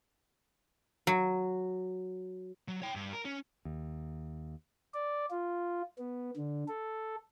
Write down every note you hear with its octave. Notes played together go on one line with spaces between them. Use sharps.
F#3
F#3
C#5 G5
G2
A#4
C#4
D#2
D5
F4
B3
D3
A4